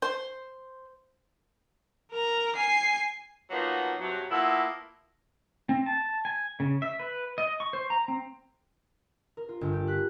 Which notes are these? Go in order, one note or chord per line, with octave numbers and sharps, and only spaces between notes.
C5
A#4 A#5
G#5 C7
F3 F#3 A#3 B3 D#4
G2 C3 F#3
A#3 B3 E4 F4 A4
C4
A5
G#5
C#3
E5
B4
D#5
C#6
C5
A#5
C4
A#4
F4
G1
G4
F#6 B6